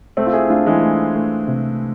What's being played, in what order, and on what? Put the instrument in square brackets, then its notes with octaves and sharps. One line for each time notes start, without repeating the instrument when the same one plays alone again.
[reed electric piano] C2 [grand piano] A3 C4
[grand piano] F4
E4 G#4
[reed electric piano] A3 [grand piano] D4 F4
[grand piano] E3 G#3
[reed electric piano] A3
A3
C3